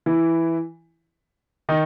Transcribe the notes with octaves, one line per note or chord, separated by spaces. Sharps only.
E3 E4
D#3 D#4